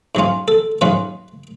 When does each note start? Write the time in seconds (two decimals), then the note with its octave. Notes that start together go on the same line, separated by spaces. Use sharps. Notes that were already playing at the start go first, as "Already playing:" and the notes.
0.15 G#2 F#3 C#4 F4
0.48 A4
0.81 G#2 F#3 C#4 F4 B4